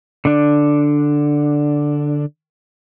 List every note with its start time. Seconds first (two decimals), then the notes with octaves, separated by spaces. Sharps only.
0.25 D3 D4